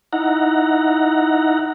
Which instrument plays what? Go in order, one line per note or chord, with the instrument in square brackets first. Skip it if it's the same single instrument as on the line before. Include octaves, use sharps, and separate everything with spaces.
[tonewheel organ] D#4 E4 F#5 A#5